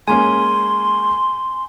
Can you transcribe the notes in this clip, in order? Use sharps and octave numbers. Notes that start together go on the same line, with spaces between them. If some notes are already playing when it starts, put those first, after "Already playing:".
G#3 A#3 C#4 G#5 C6